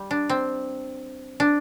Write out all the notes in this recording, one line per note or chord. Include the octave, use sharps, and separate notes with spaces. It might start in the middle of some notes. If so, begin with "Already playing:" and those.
Already playing: G3
D4
C4
D4